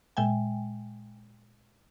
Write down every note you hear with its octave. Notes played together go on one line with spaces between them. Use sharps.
A#2 G#3 E5 G5 G#5